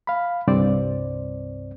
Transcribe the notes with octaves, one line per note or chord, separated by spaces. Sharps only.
F5 B5
C2 G2 C4 C5 D5